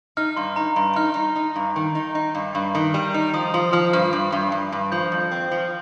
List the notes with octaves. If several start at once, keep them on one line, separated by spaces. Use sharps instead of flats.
D#4 F6
G2 C6
D#4 A#5
G2 C6
D#4 F6
D#4
D#4
G2
D#3
D#4
D#4
G2
G2
D#3
G3
D#4
F3 D#6
F3 C6
F3 F6
G2 F6
G2
G2
G2
G2
F3 G6
F2
C4
F3